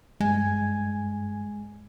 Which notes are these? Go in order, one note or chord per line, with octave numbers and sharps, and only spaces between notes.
G2 G#3 G#5 G#6